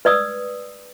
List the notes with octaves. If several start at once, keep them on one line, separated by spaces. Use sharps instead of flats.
B4 D5 D#6 E6